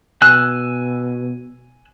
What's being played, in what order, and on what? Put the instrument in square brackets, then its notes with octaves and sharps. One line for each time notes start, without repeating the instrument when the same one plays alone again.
[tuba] B2 [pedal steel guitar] G#5 E6 F#6